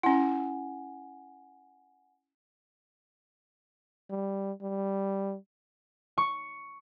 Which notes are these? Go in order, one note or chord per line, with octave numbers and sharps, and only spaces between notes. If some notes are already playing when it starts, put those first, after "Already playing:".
C#4 E4 F#5 G#5
G3
G3
C#6